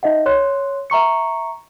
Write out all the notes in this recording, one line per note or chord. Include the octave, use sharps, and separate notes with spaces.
D#4 D#5 E5 F#5
C#5 C6 F#6
E5 A#5 C#6 C#7